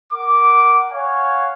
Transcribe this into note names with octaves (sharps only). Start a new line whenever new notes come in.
A#4 F#5 D6
C#5 F5 F#5 G#5